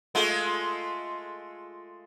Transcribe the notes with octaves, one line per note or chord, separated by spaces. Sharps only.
G#3 A3 F4